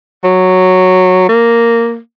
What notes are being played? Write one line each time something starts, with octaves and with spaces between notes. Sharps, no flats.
F#3
A#3